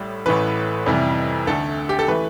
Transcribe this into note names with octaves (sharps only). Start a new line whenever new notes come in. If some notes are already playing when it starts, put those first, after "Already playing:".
Already playing: A1 A2 G3
A1 A2 E3 A3 B4
F2 C3 E3 G3
D2 D3 A3 A4
G4
A4
E3 A3 B4